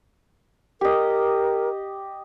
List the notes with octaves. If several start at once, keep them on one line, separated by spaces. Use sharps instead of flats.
G4 A#4 D#5